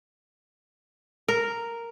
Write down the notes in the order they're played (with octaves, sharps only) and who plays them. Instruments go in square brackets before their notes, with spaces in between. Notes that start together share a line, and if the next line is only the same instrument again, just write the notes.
[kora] A#4